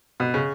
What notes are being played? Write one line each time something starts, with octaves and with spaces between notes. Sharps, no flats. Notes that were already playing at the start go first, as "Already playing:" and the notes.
B2
C#3